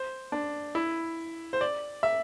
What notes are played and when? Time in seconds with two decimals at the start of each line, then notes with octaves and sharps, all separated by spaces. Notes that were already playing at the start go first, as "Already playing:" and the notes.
Already playing: C5
0.32 D4
0.75 E4
1.53 C5
1.61 D5
2.03 E5